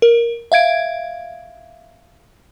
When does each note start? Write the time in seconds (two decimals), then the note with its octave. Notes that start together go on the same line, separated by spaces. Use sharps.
0.02 A#4
0.52 E5 F5 G#6 D7